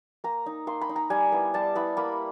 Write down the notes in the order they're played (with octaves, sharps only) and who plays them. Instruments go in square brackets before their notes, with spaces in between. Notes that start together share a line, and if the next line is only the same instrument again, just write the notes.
[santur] A#3 A#5
D#4
A#3 C6
B5
D#4
A#5
G3 G#5
B3 E4
G3 A5
B3 E4 B5
A#3 B5